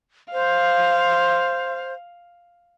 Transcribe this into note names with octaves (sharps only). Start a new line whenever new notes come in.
C5 F5